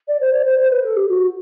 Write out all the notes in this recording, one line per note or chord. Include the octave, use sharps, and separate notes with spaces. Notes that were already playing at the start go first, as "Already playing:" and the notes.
D5
C5
D5
C5
C5
B4
A4
G4
F#4